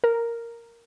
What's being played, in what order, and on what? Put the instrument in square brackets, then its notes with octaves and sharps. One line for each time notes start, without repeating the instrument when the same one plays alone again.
[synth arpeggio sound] A#4